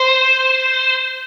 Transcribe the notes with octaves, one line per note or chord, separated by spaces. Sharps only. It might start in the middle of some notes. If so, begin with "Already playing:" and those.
Already playing: C5